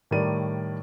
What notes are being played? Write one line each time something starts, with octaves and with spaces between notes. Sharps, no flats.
A2 D#3 G3 A#4 D5 D#7